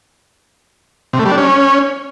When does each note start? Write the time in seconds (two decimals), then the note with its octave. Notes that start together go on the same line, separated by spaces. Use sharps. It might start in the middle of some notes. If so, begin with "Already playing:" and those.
1.13 C3
1.19 A3
1.26 G3
1.32 D4
1.38 C#4